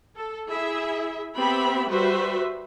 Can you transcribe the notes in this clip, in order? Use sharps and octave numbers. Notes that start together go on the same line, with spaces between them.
A4
E4 G#4 E5
B3 C4 G4 E5 B5
G3 F#4 B4 C5 E5